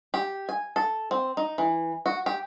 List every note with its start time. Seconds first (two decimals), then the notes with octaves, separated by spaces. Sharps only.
0.14 G4
0.49 G#5
0.76 A4
1.11 C4
1.37 D#4
1.58 E3
2.06 F#4
2.26 G4